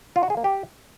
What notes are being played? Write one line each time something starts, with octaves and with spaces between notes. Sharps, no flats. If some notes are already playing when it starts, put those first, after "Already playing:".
F4
F#4
G#4
A#3
G4